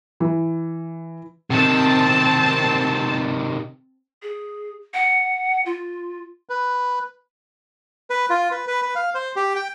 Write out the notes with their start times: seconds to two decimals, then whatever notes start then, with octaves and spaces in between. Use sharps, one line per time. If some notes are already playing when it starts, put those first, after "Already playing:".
0.20 E3
1.50 C3 D#3 C4 A5
4.23 G#4
4.94 F#5
5.66 F4
6.49 B4
8.10 B4
8.30 F4
8.51 B4
8.67 B4
8.82 B4
8.95 F5
9.15 C5
9.36 G4
9.56 G5